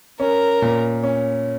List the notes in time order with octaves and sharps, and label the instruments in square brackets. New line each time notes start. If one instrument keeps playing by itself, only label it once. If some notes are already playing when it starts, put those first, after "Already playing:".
[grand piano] C#4 [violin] A#4
[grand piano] A#2
C#4